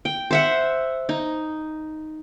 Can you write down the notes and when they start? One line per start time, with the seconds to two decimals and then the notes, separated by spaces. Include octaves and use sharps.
0.05 G5
0.31 C5 E5 F#5
1.09 D#4